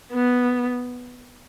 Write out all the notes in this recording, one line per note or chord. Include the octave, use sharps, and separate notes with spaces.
B3